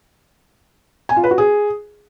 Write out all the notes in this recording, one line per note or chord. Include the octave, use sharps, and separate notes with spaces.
G#5
F4
B4
F#4
G#4